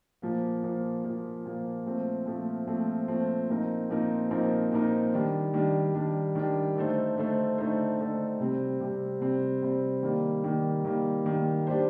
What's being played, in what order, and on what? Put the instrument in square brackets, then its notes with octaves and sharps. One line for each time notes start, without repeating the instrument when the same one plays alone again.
[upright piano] A#2 F3 A#3
A#2 F3 A#3
A#2 F3 A#3
A#2 F3 A#3
A#2 F3 A3 C4
A#2 F3 A3 C4
A#2 F3 A3 C4
A#2 F3 A3 C4
A#2 F3 C4 D#4 A#4
A#2 F3 C4 D#4 A#4
A#2 F3 C4 D#4 A#4
A#2 F3 C4 D#4 A#4
D#3 G3 D4
D#3 G3 D4
D#3 G3 D4
D#3 G3 D4
D3 A3 D#4 A4 C5
D3 A3 D#4 A4 C5
D3 A3 D#4 A4 C5
D3 A3 D#4 A4 C5
C3 G3 C4
C3 G3 C4
C3 G3 C4
C3 G3 C4
D#3 G3 A#3
D#3 G3 A#3
D#3 G3 A#3
D#3 G3 A#3
G3 D4 G4 C5